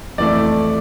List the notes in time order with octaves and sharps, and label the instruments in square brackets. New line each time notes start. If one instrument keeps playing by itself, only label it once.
[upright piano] F2 E3 A3 D5